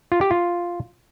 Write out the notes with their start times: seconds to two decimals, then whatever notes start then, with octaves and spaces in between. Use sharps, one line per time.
0.12 F4
0.21 G4
0.31 F4